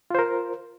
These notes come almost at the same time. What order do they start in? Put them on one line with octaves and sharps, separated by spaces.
F4 C5 A#4